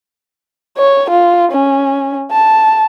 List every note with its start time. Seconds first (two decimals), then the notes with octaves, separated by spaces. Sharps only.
0.78 C#5
1.10 F4
1.52 C#4
2.31 A5